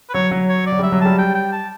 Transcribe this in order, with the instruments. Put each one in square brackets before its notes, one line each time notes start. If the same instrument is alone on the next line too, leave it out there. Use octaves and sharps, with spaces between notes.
[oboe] B4
[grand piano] F#3 [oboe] C#5
[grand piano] F#3
[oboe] C#5
D5
[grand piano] F#3
G3
[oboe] E5
[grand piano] F#3
[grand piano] G3 [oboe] A5
[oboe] G5
G5
A5